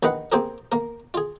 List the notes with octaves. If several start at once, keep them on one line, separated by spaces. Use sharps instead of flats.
A#1 D#3 B4 D#5 F5 F#5
A#3 C4 G4 G#4 A#4
A#3 A#4
F4 G#4